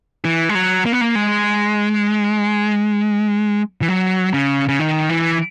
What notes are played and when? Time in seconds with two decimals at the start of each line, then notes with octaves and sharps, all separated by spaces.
0.25 E3
0.49 G#3
0.55 F#3
0.85 A#3
0.93 B3
1.01 A#3
1.15 G#3
3.82 E3
3.88 F#3
4.34 C#3
4.69 C#3
4.79 D#3
5.09 E3